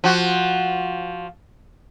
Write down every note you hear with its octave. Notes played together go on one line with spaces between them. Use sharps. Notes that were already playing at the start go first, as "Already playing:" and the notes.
F3 F#4